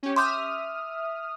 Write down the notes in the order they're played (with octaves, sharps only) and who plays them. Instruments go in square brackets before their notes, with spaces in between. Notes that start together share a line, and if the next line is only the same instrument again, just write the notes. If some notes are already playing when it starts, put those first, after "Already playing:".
[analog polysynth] C#4 G4
[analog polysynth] E5 D#6 F6 [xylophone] C6 D6 G6